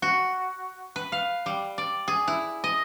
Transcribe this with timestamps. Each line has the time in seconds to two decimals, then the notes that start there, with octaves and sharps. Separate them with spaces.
0.02 F#4
0.96 B4
1.12 F5
1.46 G3
1.78 D5
2.08 G#4
2.28 E4
2.64 D#5